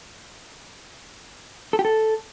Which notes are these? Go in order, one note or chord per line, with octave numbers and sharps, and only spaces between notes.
A4
G4
A4